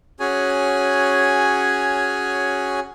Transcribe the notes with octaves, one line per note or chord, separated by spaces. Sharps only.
C#4 F#4 G#4 C#5 G#5